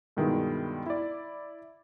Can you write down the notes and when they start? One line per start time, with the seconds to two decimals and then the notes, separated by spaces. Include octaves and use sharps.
0.17 G2 B2 D#3 G3 G#3 E4
0.86 E4 D5